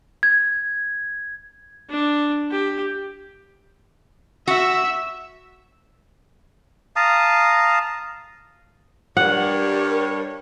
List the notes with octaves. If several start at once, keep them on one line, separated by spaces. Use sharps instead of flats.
G#6
D4
G4
F#4 E5 E6
F5 A5 A#5 D#6
G2 G3 A#4 C#5 F#5